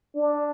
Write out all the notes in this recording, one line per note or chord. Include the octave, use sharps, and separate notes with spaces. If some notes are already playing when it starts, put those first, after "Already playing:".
D4